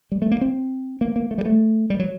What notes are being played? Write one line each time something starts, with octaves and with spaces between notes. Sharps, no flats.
G3
A3
A#3
C4
A#3
A#3
A3
G3
A3
G3
F#3